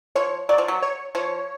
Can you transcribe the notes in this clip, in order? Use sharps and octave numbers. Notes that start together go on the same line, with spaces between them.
F3 C#5
F#3 D5
F3
F#3
C#5
F3 C#5